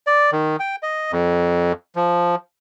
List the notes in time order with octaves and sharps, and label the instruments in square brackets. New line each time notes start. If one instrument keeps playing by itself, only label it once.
[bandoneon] D5
D#3
G5
D#5
F2
F3